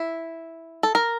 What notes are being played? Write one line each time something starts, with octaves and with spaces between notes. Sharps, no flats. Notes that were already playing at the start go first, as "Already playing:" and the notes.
Already playing: E4
A4
A#4